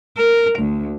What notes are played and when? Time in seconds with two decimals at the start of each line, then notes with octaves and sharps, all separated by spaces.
0.17 A#4
0.59 D2